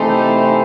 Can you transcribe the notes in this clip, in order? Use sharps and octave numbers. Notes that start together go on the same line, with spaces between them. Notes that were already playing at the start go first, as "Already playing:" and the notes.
Already playing: C3 E3 A3 D#4 G4 C5